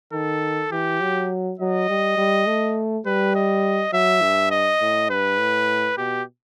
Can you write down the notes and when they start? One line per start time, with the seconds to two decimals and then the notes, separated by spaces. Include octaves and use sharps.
0.13 D#3 A4
0.71 E3 G4
1.01 F#3
1.59 F#3 D#5
1.89 G3
2.17 G3
2.47 A3
3.06 G3 B4
3.35 D#5
3.93 F#3 E5
4.22 G2
4.51 D#5
4.81 A2
5.10 G2 B4
5.39 A2
5.97 B2 G4